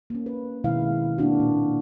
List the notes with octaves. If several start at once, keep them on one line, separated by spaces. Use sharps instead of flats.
A#3 C#4
B4
B2 D#3 G#3 E4 F5
A#3 C4 D4 F#4
A#2